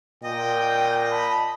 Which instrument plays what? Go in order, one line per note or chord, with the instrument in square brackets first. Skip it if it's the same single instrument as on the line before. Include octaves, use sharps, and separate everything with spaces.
[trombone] A#2 [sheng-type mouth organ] D#5 [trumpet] G5
[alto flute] A5 [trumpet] B5